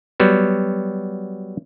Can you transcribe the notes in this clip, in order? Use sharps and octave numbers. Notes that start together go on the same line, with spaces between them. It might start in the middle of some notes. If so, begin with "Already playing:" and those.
F#3 G3 B3 F#4